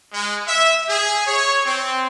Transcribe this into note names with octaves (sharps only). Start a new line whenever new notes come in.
G#3
E5
G#4
C#5
C4